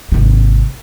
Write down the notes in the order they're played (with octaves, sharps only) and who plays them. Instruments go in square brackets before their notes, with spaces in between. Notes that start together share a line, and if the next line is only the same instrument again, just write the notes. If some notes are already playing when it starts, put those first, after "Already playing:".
[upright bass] G#1 C3